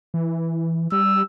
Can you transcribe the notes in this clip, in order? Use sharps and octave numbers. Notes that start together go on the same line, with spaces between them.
E3
G3 E6